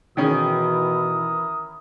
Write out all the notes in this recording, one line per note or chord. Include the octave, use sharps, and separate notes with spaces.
B2 D#3 E3 C#4 E4 G#4 A#4 D#6